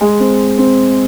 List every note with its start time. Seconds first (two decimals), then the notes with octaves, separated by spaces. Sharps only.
0.01 G#3
0.20 C4
0.58 C4